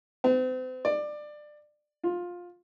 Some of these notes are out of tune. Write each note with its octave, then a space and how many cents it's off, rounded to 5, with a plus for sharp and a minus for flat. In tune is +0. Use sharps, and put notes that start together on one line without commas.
C4 -40
D5 +20
F4 +15